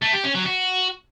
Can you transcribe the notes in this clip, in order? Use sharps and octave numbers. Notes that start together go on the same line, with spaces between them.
A3
G4
C#4
F#3
F#4